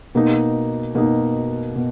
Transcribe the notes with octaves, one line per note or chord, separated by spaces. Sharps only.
B2 A#3 D#4
B2 A#3 D#4
B2